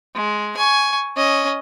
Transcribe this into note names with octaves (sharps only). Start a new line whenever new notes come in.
G#3
G#5 C#6
C#4 D#5